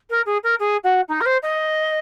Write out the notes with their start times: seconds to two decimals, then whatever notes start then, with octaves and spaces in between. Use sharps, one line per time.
0.10 A#4
0.26 G#4
0.43 A#4
0.59 G#4
0.83 F#4
1.08 D#4
1.20 A#4
1.25 C5
1.42 D#5